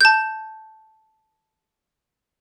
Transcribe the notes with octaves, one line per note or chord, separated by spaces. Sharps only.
A5 G6